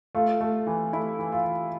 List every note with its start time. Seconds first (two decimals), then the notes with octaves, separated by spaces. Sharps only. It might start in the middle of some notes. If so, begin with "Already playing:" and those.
0.15 A3 F4
0.41 A3
0.67 E3
0.93 A3 E4
1.19 E3
1.32 F4
1.45 E3